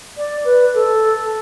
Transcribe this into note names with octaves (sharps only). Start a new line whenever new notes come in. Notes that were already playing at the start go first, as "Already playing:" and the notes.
D5
B4
A4